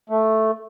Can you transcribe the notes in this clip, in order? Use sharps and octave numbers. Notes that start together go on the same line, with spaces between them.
A3